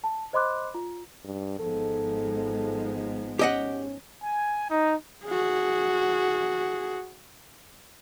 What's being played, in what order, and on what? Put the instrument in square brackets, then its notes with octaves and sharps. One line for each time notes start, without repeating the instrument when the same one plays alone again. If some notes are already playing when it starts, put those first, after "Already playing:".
[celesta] A5
C5 D#5 B5 C6 D6 F#6
F4
[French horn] G2
[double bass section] G#1 F3 G#3 [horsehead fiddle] B3 D#4 [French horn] A4
[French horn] C#4 [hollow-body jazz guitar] G4 D#5 F#5
[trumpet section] G#5
D#4
[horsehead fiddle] F#4 G#4